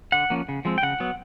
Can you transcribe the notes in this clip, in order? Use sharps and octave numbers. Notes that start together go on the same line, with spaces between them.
D3 F#5
F3 A#3 C#4
C#3
F3 G#3 C4
G5
C#3 F#5
F#3 B3